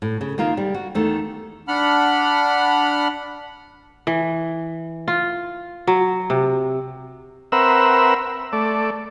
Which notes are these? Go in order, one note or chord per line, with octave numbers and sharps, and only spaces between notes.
A2
C#3
D#3 A#3 F4 A#4
G3
F#4
E2 D#3 A3
D4 F#5 B5 F6
E3
F4
F#3
C3
C4 A#4 B4 E5 F#5 E6
A3 D5